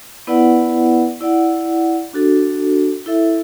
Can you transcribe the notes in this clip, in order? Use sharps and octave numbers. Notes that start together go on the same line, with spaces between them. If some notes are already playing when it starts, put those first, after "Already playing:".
B3 E4 B4 D5 F#5
E4 D5 F#5
D4 F#4 A4
E4 A4 E5